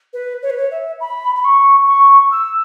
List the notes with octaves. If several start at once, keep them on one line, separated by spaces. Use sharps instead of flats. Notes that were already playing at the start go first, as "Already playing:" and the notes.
B4
C#5
B4
C#5
E5
B5
B5
C#6
C#6
E6